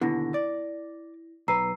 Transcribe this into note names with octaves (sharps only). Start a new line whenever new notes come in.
D#2 B2 D3 E4 A#6
D5
B1 B4 A#5 E6 C7